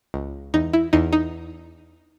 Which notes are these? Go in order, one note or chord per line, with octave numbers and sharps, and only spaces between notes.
C#2
E2 D#4
E4
E2 D#4
D#4